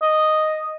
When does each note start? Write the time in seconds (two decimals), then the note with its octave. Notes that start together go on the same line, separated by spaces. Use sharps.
0.02 D#5